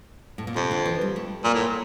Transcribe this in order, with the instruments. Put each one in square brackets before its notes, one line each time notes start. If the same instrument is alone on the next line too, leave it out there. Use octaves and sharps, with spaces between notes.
[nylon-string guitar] A2
A#2
[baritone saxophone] F2 [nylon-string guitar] C3
[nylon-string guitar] D3
E3
G3
A3
[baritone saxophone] A#2 [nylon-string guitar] A#3
[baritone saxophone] A2